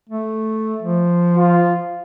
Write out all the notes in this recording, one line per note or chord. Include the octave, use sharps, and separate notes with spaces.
A3
F3
F4